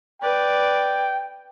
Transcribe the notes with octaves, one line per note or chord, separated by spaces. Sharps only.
B4 D5 G5